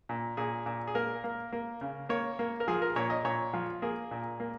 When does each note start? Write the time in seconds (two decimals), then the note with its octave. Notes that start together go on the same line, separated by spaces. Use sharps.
0.09 A#2
0.37 A#2 G#4
0.66 A#2
0.87 G#4
0.95 A#3 A#4
1.24 A#3
1.52 A#3
1.81 C#3
2.09 A#3 C#5
2.39 A#3
2.60 A#4
2.68 F3 G#4
2.82 A#4
2.96 A#2 C#5
3.10 D#5
3.25 A#2 C#5
3.54 F3
3.82 A#3 G#4
4.11 A#2
4.40 A#3